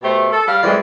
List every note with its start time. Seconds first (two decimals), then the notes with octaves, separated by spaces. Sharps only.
0.03 B2 A3 G4 C5
0.32 A4
0.47 G3 F5
0.63 F2 E3 G3 G#3